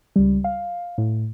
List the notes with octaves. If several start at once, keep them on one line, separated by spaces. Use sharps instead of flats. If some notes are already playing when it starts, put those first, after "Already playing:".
C#2 G3
F5
A2